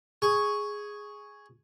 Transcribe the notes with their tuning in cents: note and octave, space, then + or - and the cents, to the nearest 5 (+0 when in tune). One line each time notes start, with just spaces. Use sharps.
G#4 +0 C#6 +0